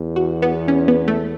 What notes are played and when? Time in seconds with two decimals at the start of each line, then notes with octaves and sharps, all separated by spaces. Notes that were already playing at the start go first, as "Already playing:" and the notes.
Already playing: E2
0.16 F#4
0.42 B3
0.68 C#4
0.88 B3
1.08 A3